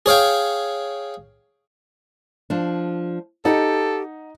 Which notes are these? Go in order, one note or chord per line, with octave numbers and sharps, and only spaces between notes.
G#4 C#5 F5 G5
F3 D4
D#4 G4 A4 F#5